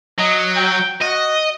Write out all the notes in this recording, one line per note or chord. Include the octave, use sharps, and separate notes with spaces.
F#3 D#5
G5
F#4 D#5